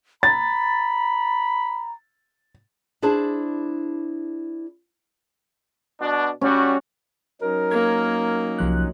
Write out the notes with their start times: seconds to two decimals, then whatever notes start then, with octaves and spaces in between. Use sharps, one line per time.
0.23 A#5 B5 A6
3.02 D4 E4 G#4 C5 D5 A5
6.01 B2 D4
6.41 G3 C#4 F#4
7.42 F#3 C#4 D#4 A#4
7.71 A#3 G#6
8.59 C2 F3 F#6